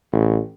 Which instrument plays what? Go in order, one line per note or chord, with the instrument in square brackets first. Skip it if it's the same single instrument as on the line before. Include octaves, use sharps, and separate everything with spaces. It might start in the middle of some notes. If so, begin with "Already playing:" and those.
[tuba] A1